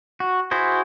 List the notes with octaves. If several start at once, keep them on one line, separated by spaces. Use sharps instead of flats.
F#4
E4 F#4 G#4 C5